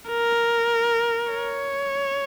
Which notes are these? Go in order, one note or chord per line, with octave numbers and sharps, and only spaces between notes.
A#4
C#5